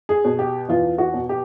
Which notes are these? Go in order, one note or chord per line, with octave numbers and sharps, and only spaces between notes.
G#4
B2
G4
E2 F4
F#4
B2
G4